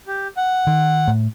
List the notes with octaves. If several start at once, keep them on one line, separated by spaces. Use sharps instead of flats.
G4
F#5
D#3
A2